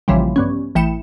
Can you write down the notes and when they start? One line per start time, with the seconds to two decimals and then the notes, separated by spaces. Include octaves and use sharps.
0.08 A#1 C#3 E3 F3 G3
0.36 G2 B3 C#4
0.75 A1 E3 G5 C#7 E7